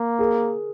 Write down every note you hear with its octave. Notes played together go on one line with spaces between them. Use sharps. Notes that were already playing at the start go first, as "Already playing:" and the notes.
Already playing: A#3
G#4 A#4